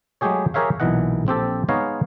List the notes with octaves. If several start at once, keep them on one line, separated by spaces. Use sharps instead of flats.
F#3 G#3 A3 G4 G#4 C#5
G4 G#4 A#4 C#5 E5 F5
B1 A#2 E3 D#5 F#5
A#1 C4 G4 A4
G#3 B3 D#4 C#5 D#5 F5